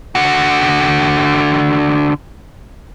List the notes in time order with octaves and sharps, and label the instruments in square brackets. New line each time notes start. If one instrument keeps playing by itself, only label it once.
[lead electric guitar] D3 F#4